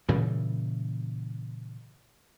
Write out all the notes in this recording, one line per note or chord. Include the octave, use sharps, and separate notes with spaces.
A#2 C#3 E3 G3